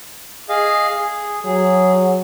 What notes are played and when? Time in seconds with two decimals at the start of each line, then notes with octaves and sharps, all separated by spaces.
0.49 G#4 D#5 F5
0.97 G#4
1.45 F#3 G#4